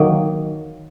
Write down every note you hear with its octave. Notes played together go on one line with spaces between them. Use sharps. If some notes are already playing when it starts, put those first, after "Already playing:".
Already playing: D#3 F#3 A#3 D#4